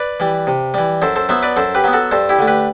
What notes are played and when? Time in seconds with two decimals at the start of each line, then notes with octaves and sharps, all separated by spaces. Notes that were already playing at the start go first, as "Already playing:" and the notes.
Already playing: B4 D5
0.20 E3 G3
0.47 C3
0.74 E3 G3
1.02 F#2 A4 C5
1.16 A4 C5
1.29 F#3 B3 C5 E5
1.43 B4 D5
1.57 F#2 A4 C5
1.75 G4 B4
1.84 F#3 B3
1.93 F#4 A4
2.11 G2 A4 C5
2.29 E4 G4
2.39 D3 A3
2.47 G4 B4